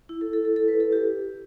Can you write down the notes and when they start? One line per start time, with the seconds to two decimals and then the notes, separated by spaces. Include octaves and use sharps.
0.09 E4
0.21 A4
0.33 A4
0.45 A4
0.56 A4
0.68 B4
0.80 A4
0.92 G4